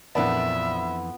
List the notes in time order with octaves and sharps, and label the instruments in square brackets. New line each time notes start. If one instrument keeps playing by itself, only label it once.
[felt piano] A#1 A#4 D5 [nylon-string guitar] F2 E3 A5 [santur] B3 [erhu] E5